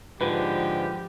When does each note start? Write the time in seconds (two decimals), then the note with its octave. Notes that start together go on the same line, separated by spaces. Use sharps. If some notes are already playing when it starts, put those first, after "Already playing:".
0.21 G#2 D3 F3 G4 B4